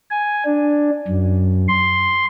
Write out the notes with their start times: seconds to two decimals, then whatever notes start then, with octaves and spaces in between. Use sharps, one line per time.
0.11 G#5
0.45 D4
1.08 F#2
1.68 C6